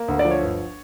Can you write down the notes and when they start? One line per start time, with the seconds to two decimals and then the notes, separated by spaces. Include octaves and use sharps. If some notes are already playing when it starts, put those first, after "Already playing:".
Already playing: A#3
0.08 D2
0.19 D5
0.25 F3
0.31 C#5
0.42 G1